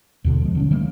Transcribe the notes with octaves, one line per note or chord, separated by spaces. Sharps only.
D#2 B2 D3
F3 G#3
D3 C4 C#4
D#3 G3 A3 A#3